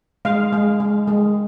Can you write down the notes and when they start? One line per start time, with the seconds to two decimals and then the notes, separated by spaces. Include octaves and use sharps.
0.25 G#3 F5
0.53 G#3
0.80 G#3
1.07 G#3